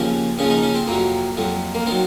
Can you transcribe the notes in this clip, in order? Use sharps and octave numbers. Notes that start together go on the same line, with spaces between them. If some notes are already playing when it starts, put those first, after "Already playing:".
Already playing: D#2 C#3 F3 C4
D#2 C#3 F3 C#4
D#4
C#4
C4
F2 C3 F#3 A#3
F2 C3 F#3
A#3
D#3 F#3 C4